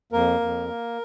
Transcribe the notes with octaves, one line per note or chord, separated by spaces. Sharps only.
F2 A#3 A#4
F2
A#3